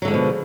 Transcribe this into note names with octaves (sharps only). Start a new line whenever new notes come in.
B2 D3 F3 F#3 G#3